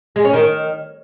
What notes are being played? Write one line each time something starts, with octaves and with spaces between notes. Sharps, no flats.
G#3
C#4
D#3